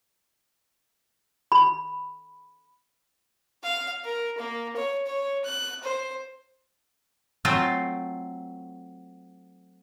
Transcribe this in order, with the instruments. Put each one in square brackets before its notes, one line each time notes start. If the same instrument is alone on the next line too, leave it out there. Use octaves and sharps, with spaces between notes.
[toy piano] B5
[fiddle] F5
A#4
A#3
C#5
C#5
F#6
C5
[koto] F#3 A3 C4 F4